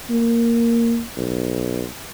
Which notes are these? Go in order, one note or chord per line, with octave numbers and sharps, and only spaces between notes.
A#3
B1